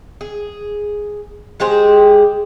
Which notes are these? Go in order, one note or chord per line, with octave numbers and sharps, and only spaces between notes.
G#4
G#3 G4 G#4 C5